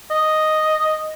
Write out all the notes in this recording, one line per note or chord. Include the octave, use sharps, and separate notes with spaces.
D#5